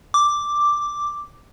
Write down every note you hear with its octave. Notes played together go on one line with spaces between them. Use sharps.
D6